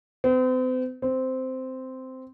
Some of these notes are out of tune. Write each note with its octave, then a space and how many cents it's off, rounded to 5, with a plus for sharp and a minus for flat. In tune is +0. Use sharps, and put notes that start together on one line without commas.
C4 -40
C4 -10